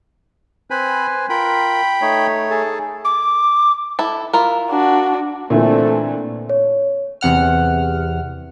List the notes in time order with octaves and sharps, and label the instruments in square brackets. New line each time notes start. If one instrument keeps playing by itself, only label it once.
[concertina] C4 B5 [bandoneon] B4 C5 G#5
[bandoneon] F4 A#4 [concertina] G5 B5
[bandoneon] A3 D#4 C#5
[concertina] G#4 A4
[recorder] D6
[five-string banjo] E4 A4
E4 F4 A#4
[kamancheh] D4 F#4
[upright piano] A#2 D3 E3 [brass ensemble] A3 C4
[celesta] C#5
[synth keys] E2 C3 F#5 F6